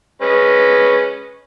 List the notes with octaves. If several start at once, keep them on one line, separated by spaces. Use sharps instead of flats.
G#3 C#4 B4